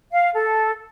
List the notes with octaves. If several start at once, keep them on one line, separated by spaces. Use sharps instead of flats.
F5
A4